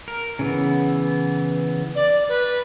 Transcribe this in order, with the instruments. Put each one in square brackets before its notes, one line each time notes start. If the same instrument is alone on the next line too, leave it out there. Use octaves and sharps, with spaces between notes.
[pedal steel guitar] A#4
C#3 E3 B3
[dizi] D5
B4